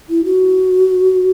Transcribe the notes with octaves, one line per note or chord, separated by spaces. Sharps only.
E4
F#4